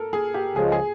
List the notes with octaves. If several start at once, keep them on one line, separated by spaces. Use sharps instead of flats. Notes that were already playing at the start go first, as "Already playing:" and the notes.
Already playing: A4 A#4
G#4
G4
C#2 C#3 F3 G#3 G#4
G#4